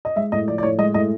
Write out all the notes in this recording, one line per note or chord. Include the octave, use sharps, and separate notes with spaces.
D#5
G#3 E5
A2 D#5
F3 D5
D5
A2 C#5
G#3 D#5
A2 D#5